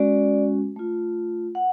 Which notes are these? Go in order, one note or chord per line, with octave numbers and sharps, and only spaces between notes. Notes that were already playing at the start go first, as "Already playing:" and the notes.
Already playing: G#3 C#4 F#4 D5
A3 F4
F#5